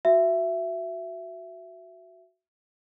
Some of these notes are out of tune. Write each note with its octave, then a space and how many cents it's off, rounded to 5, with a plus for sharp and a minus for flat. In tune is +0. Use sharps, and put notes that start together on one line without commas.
F#4 +0 E5 +15